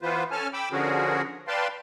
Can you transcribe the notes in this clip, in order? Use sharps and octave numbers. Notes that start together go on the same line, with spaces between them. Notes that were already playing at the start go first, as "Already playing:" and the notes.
E3 B3 F4 B4 C5
C#4 A4 G#5 A5 F6
G5 B5 D6 E6
D3 F3 C#4 F#4 G#4 A#4
B4 D5 F5 G5 A5 C6